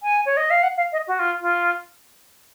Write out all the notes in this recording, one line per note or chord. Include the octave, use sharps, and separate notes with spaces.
G#5
C#5
D#5
F5
F#5
F5
D#5
F#4
F4
F4